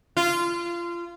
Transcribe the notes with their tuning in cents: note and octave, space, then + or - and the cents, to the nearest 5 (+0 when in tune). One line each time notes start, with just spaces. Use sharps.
F4 -25